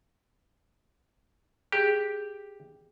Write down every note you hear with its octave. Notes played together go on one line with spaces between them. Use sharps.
G4 G#4